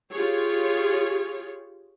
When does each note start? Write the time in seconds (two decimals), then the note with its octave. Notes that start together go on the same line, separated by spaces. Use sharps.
0.11 F4 G4 G#4 C#5